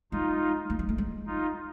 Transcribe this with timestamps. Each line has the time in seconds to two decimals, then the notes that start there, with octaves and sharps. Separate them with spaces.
0.12 G#3 D#4 F4
0.70 A3
0.79 G#3
0.89 A3
0.98 G#3
1.27 D#4 F4